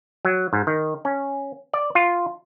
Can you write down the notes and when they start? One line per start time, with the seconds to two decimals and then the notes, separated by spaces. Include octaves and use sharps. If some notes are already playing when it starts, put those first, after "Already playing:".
0.25 F#3
0.53 G#2
0.67 D#3
1.05 C#4
1.73 D5
1.95 F4